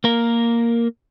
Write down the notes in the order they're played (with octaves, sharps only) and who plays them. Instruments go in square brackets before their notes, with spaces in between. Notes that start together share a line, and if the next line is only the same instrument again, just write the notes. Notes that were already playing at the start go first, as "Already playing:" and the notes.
[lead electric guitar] A#3 A#4